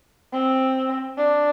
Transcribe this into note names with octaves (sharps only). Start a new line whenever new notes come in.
C4
D4